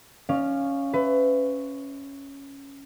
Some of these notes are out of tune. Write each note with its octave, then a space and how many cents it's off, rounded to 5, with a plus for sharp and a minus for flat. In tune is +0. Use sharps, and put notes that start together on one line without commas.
C#4 +0 D5 +40 F5 +0
B4 +25 E5 +0